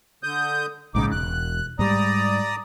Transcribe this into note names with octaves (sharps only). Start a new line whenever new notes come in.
D3 D#6 G6
A#1 G#2 C#3 D#4 D6
E1 F#6
G#2 G3 D5 A#5 D#6